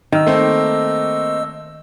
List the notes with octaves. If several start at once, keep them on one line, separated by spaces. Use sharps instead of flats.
D#3 D#5 E6
A3 A#3 C4